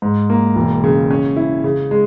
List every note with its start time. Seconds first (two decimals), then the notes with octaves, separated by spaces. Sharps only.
0.02 G#2
0.30 A#3
0.56 E1
0.84 C#3
1.11 C#4
1.36 E4
1.64 C#3
1.91 G#3